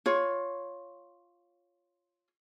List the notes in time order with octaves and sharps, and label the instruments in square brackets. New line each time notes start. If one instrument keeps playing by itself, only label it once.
[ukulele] F4 C#5